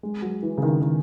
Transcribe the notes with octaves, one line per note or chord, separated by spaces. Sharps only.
G#3
F#3
E3
C#3
D#3
D#3